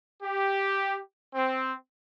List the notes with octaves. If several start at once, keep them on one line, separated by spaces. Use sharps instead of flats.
G4
C4